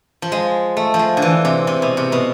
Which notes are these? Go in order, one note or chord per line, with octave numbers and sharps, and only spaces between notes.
F3
G#3
A3
F3
G#3
D3
E3
C3
C3
B2
C3
B2